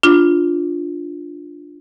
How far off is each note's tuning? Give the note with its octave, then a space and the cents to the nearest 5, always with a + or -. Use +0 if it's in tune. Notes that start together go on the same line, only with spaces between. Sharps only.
D4 +0 F4 +0